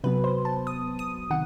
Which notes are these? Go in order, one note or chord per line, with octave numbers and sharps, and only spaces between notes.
C3 F#3 B3 B4
C5
A5
D#6
D#6
C3 D#3 F#5